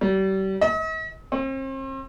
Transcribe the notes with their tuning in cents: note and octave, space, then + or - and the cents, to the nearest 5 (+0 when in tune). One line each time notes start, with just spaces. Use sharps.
G3 -35
D#5 +45
C4 +40